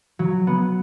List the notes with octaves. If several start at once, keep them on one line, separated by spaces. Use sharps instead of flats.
F#3
B3